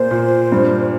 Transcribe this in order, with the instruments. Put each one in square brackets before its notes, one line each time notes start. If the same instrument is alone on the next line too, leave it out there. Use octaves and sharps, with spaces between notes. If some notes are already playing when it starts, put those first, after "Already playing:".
Already playing: [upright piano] A#2 A#3 F4 [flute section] C5
[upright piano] A#2
G2